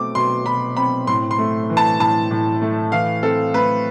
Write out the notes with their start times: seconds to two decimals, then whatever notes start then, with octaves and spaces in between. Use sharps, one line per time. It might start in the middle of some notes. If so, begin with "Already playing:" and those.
Already playing: B2 A3 C4 D6
0.15 B2 C6
0.46 B2 B5
0.76 C4 B5
1.07 A2 C6
1.31 C6
1.38 A3
1.70 E3
1.77 A5
2.00 A2 A5
2.31 A2
2.62 A3
2.92 E3 F5
3.23 C4 A4
3.54 A3 B4